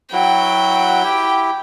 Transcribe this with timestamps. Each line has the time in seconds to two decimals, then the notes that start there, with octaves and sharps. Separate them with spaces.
0.13 F#3 E4 F#4 G5
1.04 E4 G4